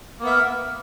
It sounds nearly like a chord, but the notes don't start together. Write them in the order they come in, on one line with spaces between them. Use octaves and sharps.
A#3 B3 E5 A#4